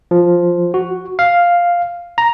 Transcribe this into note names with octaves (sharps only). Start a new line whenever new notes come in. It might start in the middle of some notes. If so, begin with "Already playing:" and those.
F3
F#4
F5
A#5